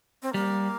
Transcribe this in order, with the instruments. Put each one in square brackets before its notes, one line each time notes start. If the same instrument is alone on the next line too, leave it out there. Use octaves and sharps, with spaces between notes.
[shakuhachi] C4
[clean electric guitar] G3 [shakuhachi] A#3